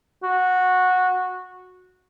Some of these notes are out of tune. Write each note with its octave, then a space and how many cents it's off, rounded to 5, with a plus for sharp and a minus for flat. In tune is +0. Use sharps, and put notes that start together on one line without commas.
F#4 -10